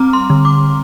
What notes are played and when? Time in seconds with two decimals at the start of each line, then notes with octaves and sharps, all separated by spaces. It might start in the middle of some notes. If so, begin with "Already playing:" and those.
Already playing: G3 C4 A#5 D6 F6
0.13 C6
0.30 D3
0.45 D6